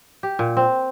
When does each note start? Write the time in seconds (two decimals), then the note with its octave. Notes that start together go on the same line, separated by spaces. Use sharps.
0.23 G4
0.39 A#2
0.57 C4